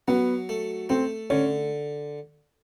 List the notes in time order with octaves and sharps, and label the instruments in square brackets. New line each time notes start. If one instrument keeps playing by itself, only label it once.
[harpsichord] F#3 [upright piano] B3
[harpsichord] A3
[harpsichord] A3 [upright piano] C4
[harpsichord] D3 [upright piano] C#4